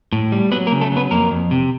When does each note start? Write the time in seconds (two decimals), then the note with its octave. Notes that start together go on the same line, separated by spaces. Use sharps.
0.12 A2
0.32 G3
0.52 F#3 B3 B4
0.67 A#3 A#4
0.72 C#3
0.81 A3 A4
0.92 F#3 B3 B4
1.11 F2 A#3 A#4
1.31 F2
1.51 C3